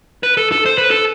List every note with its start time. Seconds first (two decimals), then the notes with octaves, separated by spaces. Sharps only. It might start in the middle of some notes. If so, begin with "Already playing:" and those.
0.23 B4
0.37 A4
0.52 A4
0.66 C5
0.78 B4
0.91 A4